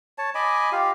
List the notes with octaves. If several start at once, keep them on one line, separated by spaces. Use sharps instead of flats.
C#5 A5
D#5 G#5 B5 D6
F4 G4 F5